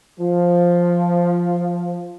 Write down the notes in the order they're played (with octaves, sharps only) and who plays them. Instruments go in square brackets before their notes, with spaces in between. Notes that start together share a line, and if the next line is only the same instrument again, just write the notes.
[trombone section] F3